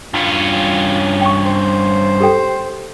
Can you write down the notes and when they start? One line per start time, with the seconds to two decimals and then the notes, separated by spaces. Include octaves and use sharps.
0.14 G2 C#4 F4
1.21 G5 C#6
1.45 C5
2.20 G4 A4 G5